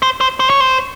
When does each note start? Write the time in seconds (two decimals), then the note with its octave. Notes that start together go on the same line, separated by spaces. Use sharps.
0.02 C5
0.21 C5
0.40 C5
0.50 C#5
0.60 C5